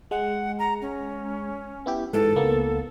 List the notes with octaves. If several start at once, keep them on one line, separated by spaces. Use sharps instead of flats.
G#3 F#5
A#5
C#4
B3 E4 G4
G#2 E3 A4
C#2 A#3 B3